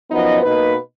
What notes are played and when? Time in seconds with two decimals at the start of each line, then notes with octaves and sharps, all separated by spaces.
0.11 F#2 F3 B3 D#4 D#5
0.43 B2 A#3 D#4 B4